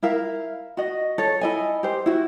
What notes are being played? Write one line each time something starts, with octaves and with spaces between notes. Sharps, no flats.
E4 A#4 E5 F5
F#4 D#5
A4 C#5
E4 D#5 G#5
G4 C5
E4 F#4